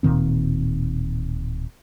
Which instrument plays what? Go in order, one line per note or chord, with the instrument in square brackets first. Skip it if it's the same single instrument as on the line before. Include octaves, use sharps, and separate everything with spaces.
[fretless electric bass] D1 A#2 D#3 C4